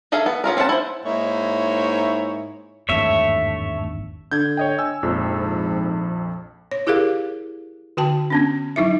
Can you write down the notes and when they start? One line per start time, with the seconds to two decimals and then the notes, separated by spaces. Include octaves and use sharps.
0.12 D#3 G#4 A4 E5 F5
0.26 B3
0.44 B3 C#4 F4 A#4
0.57 C4 C#4 C5 F#5 A5
0.69 E4 C5
1.05 G#2 A#3 D#4 E4 C#5 E5
2.89 G#1 E2 G2 A3 C#5 E5
4.31 D3 G6 G#6
4.57 C#5 D#5 G5
4.79 G#5 E6
5.03 A#1 F2 G#2
6.71 C#5
6.87 E4 G4 G#4 A#4 F5
7.97 D3 F#4 G5 A5
8.30 B3 C#4 D4
8.76 F#3 D#4 E4 E5